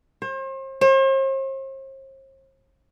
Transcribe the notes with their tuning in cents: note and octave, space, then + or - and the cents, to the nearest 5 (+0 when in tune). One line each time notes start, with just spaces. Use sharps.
C5 +40
C5 +45